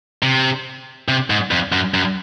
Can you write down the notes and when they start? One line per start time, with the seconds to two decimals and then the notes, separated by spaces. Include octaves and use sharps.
0.23 C3
1.08 C3
1.30 G#2
1.51 F2
1.72 F#2
1.94 F#2